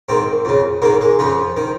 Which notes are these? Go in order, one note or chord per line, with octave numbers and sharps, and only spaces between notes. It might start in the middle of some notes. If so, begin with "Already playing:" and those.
G#2 D#3 C4
F2 C#3
G#2 D#3 A#3
G#3
F2 C#3 F3
D#3